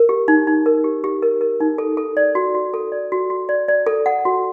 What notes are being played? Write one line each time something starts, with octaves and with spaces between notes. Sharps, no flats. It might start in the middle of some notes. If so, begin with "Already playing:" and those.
Already playing: A#4
G4
D#4
D#4
A#4
G4
G4
A#4
A#4
D#4
A4
A4
D5
F#4
F#4
A4
D5
F#4
F#4
D5
D5
A4
F#5
F#4